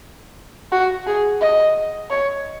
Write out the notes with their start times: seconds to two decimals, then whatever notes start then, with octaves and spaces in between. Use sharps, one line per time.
0.72 F#4
1.07 G#4
1.41 D#5
2.10 C#5